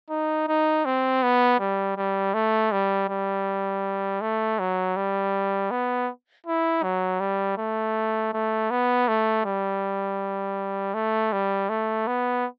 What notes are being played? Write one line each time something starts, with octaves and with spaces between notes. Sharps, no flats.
D#4
D#4
C4
B3
G3
G3
A3
G3
G3
A3
F#3
G3
B3
E4
F#3
G3
A3
A3
B3
A3
G3
A3
G3
A3
B3